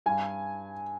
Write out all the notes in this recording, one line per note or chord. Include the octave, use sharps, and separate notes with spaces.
G2 G#5